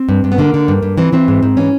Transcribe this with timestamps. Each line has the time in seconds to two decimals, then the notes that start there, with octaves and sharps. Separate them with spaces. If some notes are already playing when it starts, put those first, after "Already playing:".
Already playing: C4
0.09 G2
0.24 G2
0.32 B3
0.38 D3 A#3
0.54 D3
0.68 G2
0.83 G2
0.98 E3 C4
1.13 E3 C4
1.28 G#2
1.43 G#2
1.57 E3 C#4